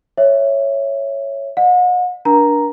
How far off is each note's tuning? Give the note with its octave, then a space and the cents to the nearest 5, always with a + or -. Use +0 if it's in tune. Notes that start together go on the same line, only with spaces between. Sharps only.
C#5 -5 E5 +5
D#5 -25 F#5 -40
D4 -5 A#4 +35 A#5 +0